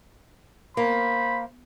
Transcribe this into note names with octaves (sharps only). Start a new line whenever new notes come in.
A#3 C5 B5